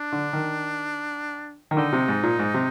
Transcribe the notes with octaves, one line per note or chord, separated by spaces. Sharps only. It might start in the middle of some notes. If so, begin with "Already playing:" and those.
Already playing: D4
D3
D#3
D#3
D3 D#4
C3
G#2
A#2
G#2
C3